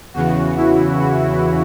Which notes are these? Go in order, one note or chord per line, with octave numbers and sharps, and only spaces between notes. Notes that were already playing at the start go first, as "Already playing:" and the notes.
E2 C#3 E3 F#4
E4
F#4
E4